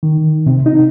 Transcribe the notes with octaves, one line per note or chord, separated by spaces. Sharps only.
D#3
C3
D#4